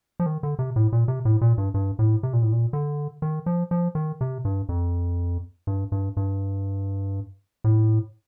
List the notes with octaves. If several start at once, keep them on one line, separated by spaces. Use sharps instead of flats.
F3
D#3
D3
C3
A2
A#2
C3
A2
A#2
G2
G2
A2
C3
A#2
A2
A#2
D3
D#3
F3
F3
D#3
C3
G2
F2
G2
G2
G2
A2